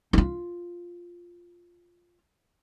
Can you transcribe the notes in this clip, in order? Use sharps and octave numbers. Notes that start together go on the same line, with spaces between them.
D#4 F4